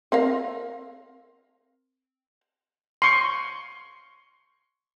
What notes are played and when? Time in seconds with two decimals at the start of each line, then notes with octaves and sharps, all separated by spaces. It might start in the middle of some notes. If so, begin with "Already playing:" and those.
0.12 C4 A#4 F5
3.02 C6 C#6